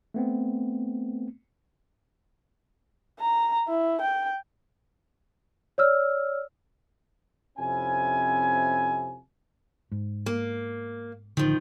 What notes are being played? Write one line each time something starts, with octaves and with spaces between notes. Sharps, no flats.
A3 B3 C4
A#5
E4
G5
C#5 D5 E6 F6
F2 C3 C#4 E4 G#5
G#2
A#3
A1 D3 D#3 F3